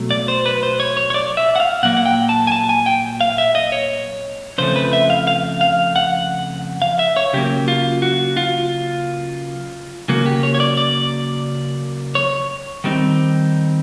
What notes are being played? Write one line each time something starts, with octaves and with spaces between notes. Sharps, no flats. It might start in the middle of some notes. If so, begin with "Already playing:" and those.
Already playing: B2 F#3 A3
D5
C5
B4
C5
C#5
C#5
C#5
D5
E5
F#5
F5
A#2 F#3 A#3 F#5
F#5
G5
A5
G#5
A5
G#5
G5
F5
E5
D#5
C#5
F2 C#3 F3 A3 C5
B4
E5
F5
F5
F5
F#5
F5
E5
C#5
C#3 F#3 A#3 G4
F4
F#4
F4
C#3 F#3 A#3 F#4
G4
C#5
C#5
D5
D5
C#5
D#3 G3 C4 D#4